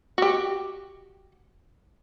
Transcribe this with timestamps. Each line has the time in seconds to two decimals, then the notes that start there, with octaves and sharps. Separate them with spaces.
0.18 F#4 G4